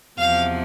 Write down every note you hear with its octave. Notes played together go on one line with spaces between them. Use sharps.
E2 C3 F3 F5